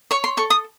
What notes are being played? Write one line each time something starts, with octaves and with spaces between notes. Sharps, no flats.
C#5 C#6
C6
A4 C#6
D#6